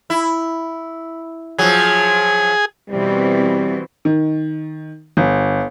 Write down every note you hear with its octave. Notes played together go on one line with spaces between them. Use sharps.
E4
F3 F#3 G#4
B2 E3 G3 C4
D#3
G1